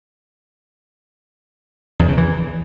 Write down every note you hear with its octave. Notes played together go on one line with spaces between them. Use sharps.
E2
C#3
E3